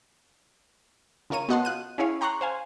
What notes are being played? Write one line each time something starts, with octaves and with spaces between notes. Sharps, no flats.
C#3 F4 A#4 C#5 D#7
B3 F#4 D#5 F#5 A5 C6
F4 F#6 D#7
C#4 E4 G#4 C#5 F5
G5 A#5 C6 C#6 F#6
C5 F5 G#5